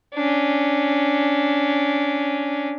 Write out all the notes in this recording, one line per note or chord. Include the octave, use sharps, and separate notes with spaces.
C#4 D4